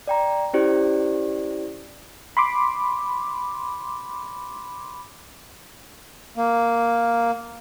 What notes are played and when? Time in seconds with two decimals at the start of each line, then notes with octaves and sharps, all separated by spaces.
0.07 D5 G5 A#5
0.53 C#4 E4 G4 C5 D5
2.37 B5 C6 D6
6.37 A#3